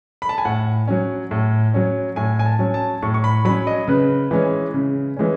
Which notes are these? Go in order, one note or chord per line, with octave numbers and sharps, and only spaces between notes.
B5
A5
G#5
A2 F#5
F#3 C#4
A2
F#3 C#4
A2 G#5
G#5
A5
F#3 C#4
A5
A2 C#6
C#6
B5
F#3 C#4 B5
D#5
C#3 B4
E3 G#3 C#4
C#3
E3 G#3 C#4